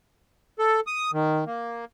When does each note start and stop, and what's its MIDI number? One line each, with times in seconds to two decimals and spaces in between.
0.59 0.80 69
0.87 1.11 87
1.13 1.44 51
1.46 1.85 58